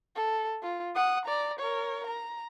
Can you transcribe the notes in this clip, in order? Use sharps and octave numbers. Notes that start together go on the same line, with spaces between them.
A4
F4
F#5 D#6
D5 A#5
A#4 C#5
A#5